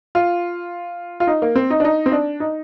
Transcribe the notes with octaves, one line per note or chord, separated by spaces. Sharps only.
F4
F4
D#4
A#3
C4
D#4
D4
D#4
C4
D4
D#4